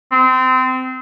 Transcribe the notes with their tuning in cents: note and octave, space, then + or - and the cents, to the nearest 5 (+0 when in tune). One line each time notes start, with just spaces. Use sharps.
C4 -25